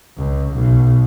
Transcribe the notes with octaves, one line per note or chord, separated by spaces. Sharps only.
C#2
B1